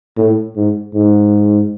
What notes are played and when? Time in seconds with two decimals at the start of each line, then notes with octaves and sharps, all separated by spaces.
0.18 A2
0.57 G#2
0.95 G#2